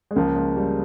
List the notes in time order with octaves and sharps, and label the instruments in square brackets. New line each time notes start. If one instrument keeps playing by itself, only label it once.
[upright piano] G#3
[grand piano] C#2 C#3 F3 [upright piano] A#3
[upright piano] G#3
G3